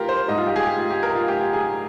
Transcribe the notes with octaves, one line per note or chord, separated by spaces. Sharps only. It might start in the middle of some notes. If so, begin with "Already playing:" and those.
Already playing: F4 G4 A#4
C5
G#2 G3 D#5
F4
G4
G#4
G4
F4
G4
A#4
F4
G4
G4
G#4